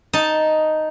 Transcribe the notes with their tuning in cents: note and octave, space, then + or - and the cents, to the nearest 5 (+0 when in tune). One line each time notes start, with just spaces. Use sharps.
D#4 +0 A5 +0